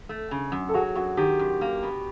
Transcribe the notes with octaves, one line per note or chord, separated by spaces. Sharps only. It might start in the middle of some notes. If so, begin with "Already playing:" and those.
A3
C#3
F#2
A4
F#3 F#4 G#4
F#2 F#4
D#3 G4
F#2
A#3
B2